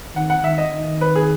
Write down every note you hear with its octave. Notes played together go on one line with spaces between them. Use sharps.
D#3 F#5
F#5
D#3 E5
D#5
D#3
B4
G#4